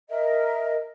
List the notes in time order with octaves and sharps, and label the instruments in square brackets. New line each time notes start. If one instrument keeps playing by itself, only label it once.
[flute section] A#4 D#5 E5